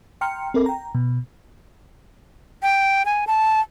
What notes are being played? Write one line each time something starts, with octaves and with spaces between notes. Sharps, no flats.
G5 A#5 C6 F6 C#7
C4 A4 A#4
G5 A#5
B2
G5
G#5
A5